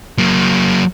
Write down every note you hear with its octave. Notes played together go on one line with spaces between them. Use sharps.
F#3 A#3